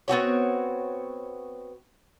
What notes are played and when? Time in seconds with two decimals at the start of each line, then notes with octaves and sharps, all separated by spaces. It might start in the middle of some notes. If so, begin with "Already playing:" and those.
0.08 B3 C4 F#4 C#5